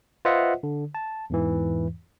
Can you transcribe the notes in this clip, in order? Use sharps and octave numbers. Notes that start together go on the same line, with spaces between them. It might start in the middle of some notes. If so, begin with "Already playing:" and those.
F4 B4 C5 D#5 E5 F#5
D3
A5
E2 G#2 E3